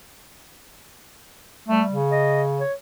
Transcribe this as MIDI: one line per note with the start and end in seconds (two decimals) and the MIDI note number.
1.69 1.97 55
1.69 1.82 57
1.91 2.61 49
2.12 2.42 75
2.59 2.73 73